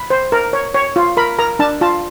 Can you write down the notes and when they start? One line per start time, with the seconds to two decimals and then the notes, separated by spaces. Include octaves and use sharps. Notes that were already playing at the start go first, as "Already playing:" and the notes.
Already playing: B5
0.10 C5
0.32 A#4
0.53 C#5
0.74 C#5
0.96 F4
1.17 A#4 B5
1.39 A#4 A#5
1.59 D4 A5
1.81 F4 A5